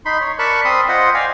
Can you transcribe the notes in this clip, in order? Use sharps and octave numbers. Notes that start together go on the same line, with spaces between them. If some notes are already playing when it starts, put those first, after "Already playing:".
D#4 B5 C6
C#5
A#4 D5 A5 B5 C#6 F#6
C4 B5 C6 D#6
F4 C5 D#5 F#5
D5 F5 G5 G#5